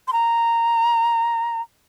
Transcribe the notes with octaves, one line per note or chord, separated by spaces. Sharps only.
C6
A#5